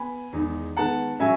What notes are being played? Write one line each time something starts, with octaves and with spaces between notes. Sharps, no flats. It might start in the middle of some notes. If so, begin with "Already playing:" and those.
Already playing: B3 G#5 B5
E2 D#3 G#3 D#4
D#3 G#3 B3 F#5 A5
F#3 C#4 E5 G#5